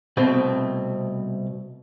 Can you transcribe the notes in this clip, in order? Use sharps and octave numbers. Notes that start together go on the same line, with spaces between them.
C2 B2 A3 C4